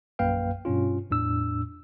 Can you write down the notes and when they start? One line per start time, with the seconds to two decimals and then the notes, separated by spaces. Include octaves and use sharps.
0.19 A#1 F#2 A#3 B4 F5 G5
0.65 G2 B2 C#4 F4
1.10 E2 A2 D4 E6